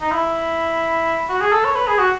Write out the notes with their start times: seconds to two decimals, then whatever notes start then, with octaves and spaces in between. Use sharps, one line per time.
0.01 D#4
0.12 E4
1.29 F#4
1.41 G#4
1.52 A4
1.64 C#5
1.76 B4
1.88 G#4
1.99 F#4